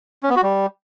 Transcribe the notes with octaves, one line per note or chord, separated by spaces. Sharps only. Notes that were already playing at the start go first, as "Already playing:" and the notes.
C#4
B3
F#4
G3